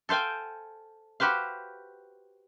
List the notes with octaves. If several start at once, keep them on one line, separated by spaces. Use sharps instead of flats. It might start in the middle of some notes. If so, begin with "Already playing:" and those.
A4 C5 F5 G5 G#5
F#4 G4 B4 C5 F5